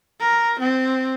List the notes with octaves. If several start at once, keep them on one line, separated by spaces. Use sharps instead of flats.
A#4
C4